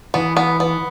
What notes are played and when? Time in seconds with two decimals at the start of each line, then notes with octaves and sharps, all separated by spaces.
0.14 E3 B3
0.37 B3
0.60 B3